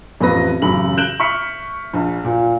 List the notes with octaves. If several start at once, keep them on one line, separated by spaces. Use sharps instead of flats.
A1 F2 B4 A#6
A1 F#2 C#3 B5 F#7
F#6 G6 D7 E7 F#7
E5 C#6 F6 B6 C#7
A#1
A#2